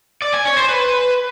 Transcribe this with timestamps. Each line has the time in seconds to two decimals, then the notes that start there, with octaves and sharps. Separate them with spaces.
0.22 D5
0.34 G#5
0.45 C#5
0.57 C5
0.69 B4